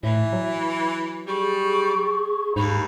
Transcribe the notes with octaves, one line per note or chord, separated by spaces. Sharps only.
A2 E3 E5
F#3
G3 G#4 C#6
D#2 G#2 D#4 B5